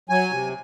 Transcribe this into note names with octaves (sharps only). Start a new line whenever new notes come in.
F#3 G#5
C3